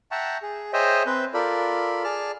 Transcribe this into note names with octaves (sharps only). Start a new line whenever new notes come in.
E5 F#5 G5 A5 A#5 C#6
G#4
G#4 C5 C#5 D#5 E5 G5
C4 B4 G6
F4 A4 A#4 D5 B5
G#4 D5 A5 F6